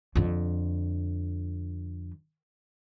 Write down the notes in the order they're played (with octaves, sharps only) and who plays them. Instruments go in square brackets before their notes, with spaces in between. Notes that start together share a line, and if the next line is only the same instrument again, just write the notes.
[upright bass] F2 D3